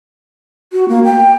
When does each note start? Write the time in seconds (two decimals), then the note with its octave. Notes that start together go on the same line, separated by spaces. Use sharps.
0.73 F#4
0.89 A#3
1.04 G5